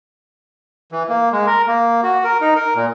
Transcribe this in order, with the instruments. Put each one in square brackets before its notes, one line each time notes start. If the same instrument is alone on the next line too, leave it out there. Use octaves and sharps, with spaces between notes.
[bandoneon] E3
A#3
G#3
A#4
A#3
F#4
A#4
D#4
A#4
A#2